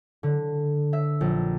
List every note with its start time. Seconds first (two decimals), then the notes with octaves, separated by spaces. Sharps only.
0.23 D3
0.93 E5
1.21 A#1